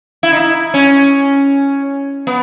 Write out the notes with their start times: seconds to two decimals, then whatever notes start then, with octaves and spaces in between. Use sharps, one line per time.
0.23 E4
0.33 D#4
0.40 E4
0.74 C#4
2.27 B3